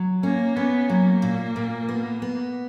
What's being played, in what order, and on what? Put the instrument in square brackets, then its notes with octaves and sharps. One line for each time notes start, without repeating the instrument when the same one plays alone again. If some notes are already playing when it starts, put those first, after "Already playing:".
Already playing: [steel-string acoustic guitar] F#3
[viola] A#3 [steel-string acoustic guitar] C#4
[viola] B3 [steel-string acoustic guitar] C#4
[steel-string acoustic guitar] F#3 [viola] A#3
[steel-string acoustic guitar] A#2
A#2
B3
B3